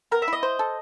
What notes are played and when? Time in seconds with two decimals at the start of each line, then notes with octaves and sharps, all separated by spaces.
0.11 B3 A#4
0.22 E5
0.28 E4 D#5
0.43 C5
0.59 A4